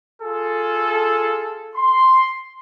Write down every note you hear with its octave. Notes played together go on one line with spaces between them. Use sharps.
F4 G#4 A4
C6